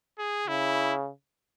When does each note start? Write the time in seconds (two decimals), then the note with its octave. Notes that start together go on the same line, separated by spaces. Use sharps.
0.19 G#4
0.48 C#3 E4